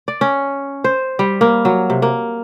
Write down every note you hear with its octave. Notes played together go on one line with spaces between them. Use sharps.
D5
C#4
C5
G3
A#3
F#3
C3
A#3